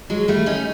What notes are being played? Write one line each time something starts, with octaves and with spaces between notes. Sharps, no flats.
F#3 G#3
G3 A3
C#4 D#4